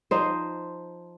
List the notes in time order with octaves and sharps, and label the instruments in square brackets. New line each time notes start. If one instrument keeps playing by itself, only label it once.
[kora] F3 D#4 C5